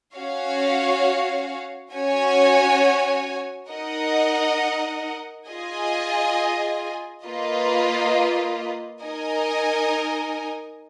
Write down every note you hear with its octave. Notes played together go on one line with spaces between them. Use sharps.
C#4 F#4 C#5 F5
C#4 F#4 C#5 G#5
D#4 A#4 D#5 F#5
F4 G#4 D#5 G#5
A#3 F4 B4 D#5
D#4 A#4 D#5 G#5